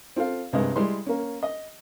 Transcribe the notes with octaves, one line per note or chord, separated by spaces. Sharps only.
C4 F4 A4 F5
C2 G2 G#3 D#5
G3 G#3 E4 C6
A#3 C#4
D#5